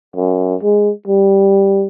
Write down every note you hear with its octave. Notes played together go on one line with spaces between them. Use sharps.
F#2
G#3
G3